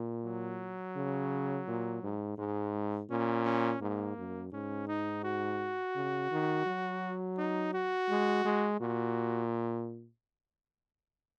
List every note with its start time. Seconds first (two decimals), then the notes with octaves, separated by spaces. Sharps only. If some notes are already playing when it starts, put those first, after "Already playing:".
Already playing: A#2
0.25 F#3
0.96 C#3
1.68 A#2
2.03 G#2
2.38 G#2 G#3
3.10 A#2 C#4
3.45 C#4
3.81 G#2 A#3
4.18 F#2
4.52 G#2 C#4
4.88 D#4
5.24 F#4
5.96 C#3
6.32 D#3
6.66 F#3
7.38 D#4
7.74 F#4
8.10 G#3
8.45 G#3
8.80 A#2 F#4